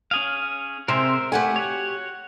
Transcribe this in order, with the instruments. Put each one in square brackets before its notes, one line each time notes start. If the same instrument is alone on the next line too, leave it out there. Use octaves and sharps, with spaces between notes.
[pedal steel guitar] C#4 G#4 F5
[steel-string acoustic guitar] C3 G#3 C4 [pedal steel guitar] A#4 C5 E5
[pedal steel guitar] A3 [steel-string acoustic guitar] G4 F#5 G#5
[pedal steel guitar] F#4 C#5